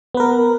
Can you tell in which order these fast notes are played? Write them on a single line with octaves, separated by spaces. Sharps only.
B3 B4 A#4